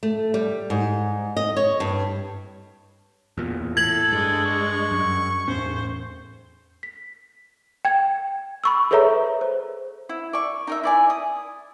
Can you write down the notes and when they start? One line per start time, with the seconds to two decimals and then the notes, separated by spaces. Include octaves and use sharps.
0.03 A3
0.34 G3
0.70 G#2
1.37 D#5
1.56 C#5
1.80 G2
3.38 E2 A#2
3.77 A2 A4 G#6 F#7
4.12 G2 G#3 D4
4.46 C#6
4.91 F#2
5.48 E2 A2 C#4 C5
6.83 B6
7.85 G5 G#6
8.64 B5 C#6 E6
8.91 G#4 A4 B4 C#5 E5 A#5
9.41 C5
10.09 E4
10.33 D5 C#6
10.67 D#4 A#4 E5
10.83 E4 D5 G#5
11.10 D#6